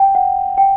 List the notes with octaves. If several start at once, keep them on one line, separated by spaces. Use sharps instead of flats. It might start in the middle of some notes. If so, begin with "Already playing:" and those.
Already playing: G5
F#5
G5